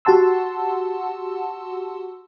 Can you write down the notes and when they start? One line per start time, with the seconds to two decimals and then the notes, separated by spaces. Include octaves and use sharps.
0.05 F#4 G4 F#5 A5 C6 E6